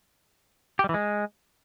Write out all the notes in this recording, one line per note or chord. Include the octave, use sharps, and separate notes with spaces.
G4
G3
E3
G#3